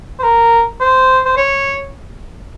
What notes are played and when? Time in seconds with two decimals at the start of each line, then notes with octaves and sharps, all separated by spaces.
0.19 C5
0.24 A#4
0.80 C5
1.25 C5
1.37 C#5